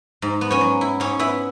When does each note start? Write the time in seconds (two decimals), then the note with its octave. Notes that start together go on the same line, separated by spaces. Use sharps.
0.22 G#2
0.41 B3
0.51 C#4 C#5
0.61 F#3
0.81 E4
1.00 G#2 C#4 C#5
1.19 B3 E4 E5